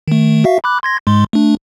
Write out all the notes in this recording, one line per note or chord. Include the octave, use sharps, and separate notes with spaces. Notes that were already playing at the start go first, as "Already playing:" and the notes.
D#3 A3
F#4 E5 F5
B5 D6 F#6
C6 G#6 A#6
G#2 G#3 C6
A3 D4